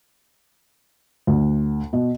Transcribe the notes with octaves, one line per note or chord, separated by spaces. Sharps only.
D2
B2